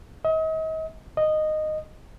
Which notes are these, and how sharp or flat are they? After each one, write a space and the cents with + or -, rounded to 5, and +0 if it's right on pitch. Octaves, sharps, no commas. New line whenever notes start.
D#5 +40
D#5 -10